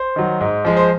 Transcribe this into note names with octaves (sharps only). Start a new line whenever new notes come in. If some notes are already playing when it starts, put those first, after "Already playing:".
Already playing: C5
D#3 F#3
G#2
F3 G#3
C5